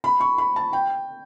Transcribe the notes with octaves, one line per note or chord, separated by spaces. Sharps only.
B5
C#6
B5
A5
G5